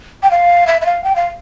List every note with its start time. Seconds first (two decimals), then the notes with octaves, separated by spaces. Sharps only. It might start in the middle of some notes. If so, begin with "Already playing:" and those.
0.23 G5
0.31 F5
0.67 E5
0.81 E5
0.86 F5
1.04 G5
1.16 F5